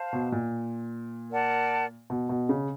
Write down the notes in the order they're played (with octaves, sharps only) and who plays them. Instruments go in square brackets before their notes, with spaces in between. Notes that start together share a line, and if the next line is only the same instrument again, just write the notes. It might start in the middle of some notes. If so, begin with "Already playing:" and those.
Already playing: [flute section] C5 F5 A5
[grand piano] B2
A#2
[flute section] A#4 D5 F#5 A5
[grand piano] B2
B2
C#3